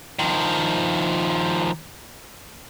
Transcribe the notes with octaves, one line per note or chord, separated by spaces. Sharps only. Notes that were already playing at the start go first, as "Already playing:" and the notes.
D#3 F3